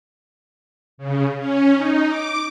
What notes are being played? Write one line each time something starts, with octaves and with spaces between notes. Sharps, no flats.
C#3
C#4
D#4
D6